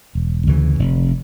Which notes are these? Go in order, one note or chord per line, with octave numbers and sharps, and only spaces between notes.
E1
D2 C#3 E3
F1